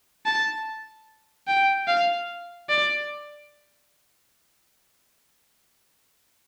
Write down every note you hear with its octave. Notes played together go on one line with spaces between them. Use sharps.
A5
G5
F5
D5